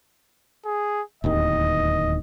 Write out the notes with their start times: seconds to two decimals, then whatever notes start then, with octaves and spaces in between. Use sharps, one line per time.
0.65 G#4
1.24 D1 D#2 D#3 D#5